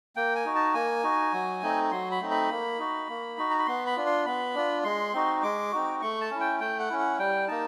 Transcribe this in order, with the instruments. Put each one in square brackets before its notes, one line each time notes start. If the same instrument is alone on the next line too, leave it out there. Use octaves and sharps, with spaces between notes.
[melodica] A#3 G5
G#5
D#4 F#4
A5
A#3 G#5
D#4 F#4
F#3
A3 C4 D#4
F#3 C6
B5
A3 C4 D#4
B5
A#3
D#4 F#4
A#3
D#4 F#4
A#5
B5
B3 C6
B5
D4 F4
C6
B3 B5
D4 F4
G#3 C6
C4 D#4 F#4
G#3 D6
C4 D#4 F#4
A3 C#6
A5
C#4 E4
G5
A3 G5
F#5
C#4 E4
F#5
G3 G5
A#3 D#4 A5